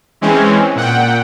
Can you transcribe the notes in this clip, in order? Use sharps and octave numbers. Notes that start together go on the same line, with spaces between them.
E3 G#3 C4 C#4
A#2 F#5 G5